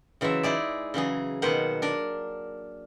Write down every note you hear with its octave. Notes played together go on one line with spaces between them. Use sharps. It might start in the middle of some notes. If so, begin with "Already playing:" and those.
C#3 E3 F#3 G#3 E5
D#4 E4 G#4 D5
C#3 E3 F#3 G#4
B2 D#3 A#3 B4 C5 F#5
D4 A#4